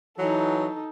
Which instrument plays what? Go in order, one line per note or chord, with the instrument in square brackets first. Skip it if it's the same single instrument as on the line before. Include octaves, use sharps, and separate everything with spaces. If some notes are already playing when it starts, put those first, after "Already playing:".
[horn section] E3 F#3 [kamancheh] D#4 A4